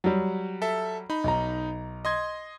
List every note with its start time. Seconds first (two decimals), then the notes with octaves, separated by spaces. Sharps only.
0.04 F#3 G3
0.62 A4 E5
1.10 D#4 B5
1.24 B1 A#5
2.05 D#5 C6 G#6